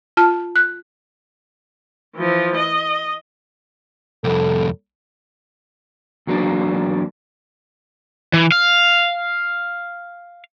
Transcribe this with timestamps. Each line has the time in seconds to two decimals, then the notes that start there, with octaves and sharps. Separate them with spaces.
0.17 F4 A5 F6
0.56 F#6
2.16 E3 F3
2.56 D#5
4.24 C2 F2 A4
6.27 E2 F#3 A#3 D4
8.34 E3
8.52 F5